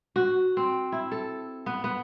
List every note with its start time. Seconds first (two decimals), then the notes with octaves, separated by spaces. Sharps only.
0.16 F#4
0.57 C4
0.92 E4
1.12 A4
1.66 B3
1.84 B3